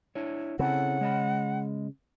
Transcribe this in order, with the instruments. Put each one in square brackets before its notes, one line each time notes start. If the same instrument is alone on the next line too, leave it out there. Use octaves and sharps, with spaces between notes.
[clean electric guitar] D4 E4 C#5
[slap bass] C#3 [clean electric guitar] C4 E4 A4 [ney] F#5
[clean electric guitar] G#3 D#5 B5